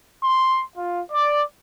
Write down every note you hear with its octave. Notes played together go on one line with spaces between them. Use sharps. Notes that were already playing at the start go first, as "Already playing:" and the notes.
C6
F4
D5